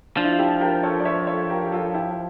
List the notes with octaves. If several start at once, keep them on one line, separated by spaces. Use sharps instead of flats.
F3 D4 F4
E4
F4
E4 G4
G4 A#4
A4 C#5
D5
C#5 E5
A4 C#5
G4 A#4
G4
F4 A4
E4 G4